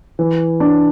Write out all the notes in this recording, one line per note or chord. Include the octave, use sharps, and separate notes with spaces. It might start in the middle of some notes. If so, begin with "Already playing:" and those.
E3
D4